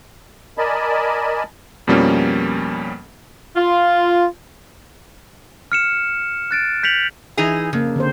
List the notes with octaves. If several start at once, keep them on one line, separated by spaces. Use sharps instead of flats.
A#4 D5 D#5 G#5 A5 B5
F2 B2 F3 G3 A#3 C#4
F4
F6 C#7 E7
F#6 A6 D7
G6 B6 C#7 F7 F#7
E3 D#4 G#4
F2 C#3 A#3
D3 C4 C5